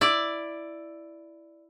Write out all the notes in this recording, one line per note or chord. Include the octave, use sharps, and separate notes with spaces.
E4 D5